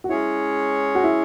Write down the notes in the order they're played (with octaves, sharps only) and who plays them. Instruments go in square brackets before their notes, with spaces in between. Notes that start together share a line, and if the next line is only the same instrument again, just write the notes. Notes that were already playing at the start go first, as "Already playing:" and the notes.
[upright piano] F#4
[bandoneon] G#3 C#4 G#4 C#5 [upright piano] E4
[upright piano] F#4
E4